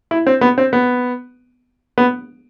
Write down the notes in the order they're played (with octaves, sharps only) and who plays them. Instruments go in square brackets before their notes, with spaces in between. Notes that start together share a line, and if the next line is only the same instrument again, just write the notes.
[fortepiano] E4
C4
B3
C4
B3
B3